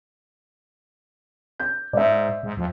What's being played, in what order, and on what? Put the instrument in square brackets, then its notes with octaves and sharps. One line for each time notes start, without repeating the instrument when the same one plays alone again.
[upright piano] G6
[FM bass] G#2 [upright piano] D5 E5
[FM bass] G#2
F2